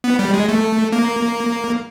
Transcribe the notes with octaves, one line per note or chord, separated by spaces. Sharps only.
B3
G3
G#3
A3
A#3